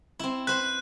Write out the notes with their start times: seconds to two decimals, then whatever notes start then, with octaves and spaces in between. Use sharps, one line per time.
0.19 C4 E4
0.47 B4 C5 F#6